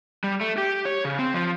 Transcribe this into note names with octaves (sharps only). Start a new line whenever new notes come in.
G3
A3
G4
C#5
C#3
C4
F3